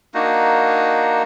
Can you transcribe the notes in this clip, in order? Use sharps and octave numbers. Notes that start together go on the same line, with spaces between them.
A#3 D4 D#4 F#4